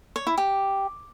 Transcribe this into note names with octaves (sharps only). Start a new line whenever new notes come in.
C#5
E4
G4